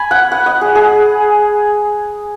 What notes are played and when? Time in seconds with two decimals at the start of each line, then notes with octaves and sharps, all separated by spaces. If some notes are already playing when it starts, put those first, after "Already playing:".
Already playing: G#5 B5
0.11 F#5
0.32 F#5
0.46 D#5
0.61 G#4
0.75 G#4